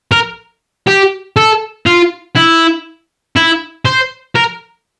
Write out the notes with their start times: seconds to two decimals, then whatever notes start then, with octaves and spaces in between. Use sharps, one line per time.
0.12 A#4
0.87 G4
1.37 A4
1.86 F4
2.36 E4
3.36 E4
3.85 C5
4.36 A#4